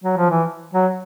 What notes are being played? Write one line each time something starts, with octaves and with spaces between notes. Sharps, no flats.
F#3
F3
E3
F#3